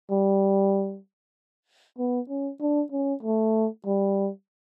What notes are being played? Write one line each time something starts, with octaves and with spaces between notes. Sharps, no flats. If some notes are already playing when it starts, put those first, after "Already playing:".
G3
B3
C#4
D4
C#4
A3
G3